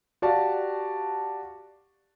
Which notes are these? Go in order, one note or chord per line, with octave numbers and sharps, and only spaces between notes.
F#4 G4 D5 F5 A5